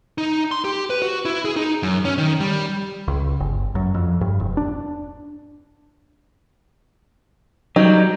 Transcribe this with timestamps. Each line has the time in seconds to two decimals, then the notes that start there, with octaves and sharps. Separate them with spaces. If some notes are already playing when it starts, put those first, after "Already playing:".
0.18 D#4
0.51 C6
0.64 G4
0.90 B4
1.02 F#4
1.25 E4
1.45 G#4
1.56 D#4
1.83 F#2
2.05 C#4
2.18 D#3
2.40 G3
3.08 C#2
3.40 G1
3.75 F#2
3.94 F2
4.21 G2
4.40 E1
4.57 D4
7.76 F#3 G3 D#4